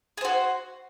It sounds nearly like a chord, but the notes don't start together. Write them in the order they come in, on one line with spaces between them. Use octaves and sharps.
G#4 C5 F#4